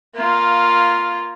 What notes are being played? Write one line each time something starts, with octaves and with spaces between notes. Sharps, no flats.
A#3 F4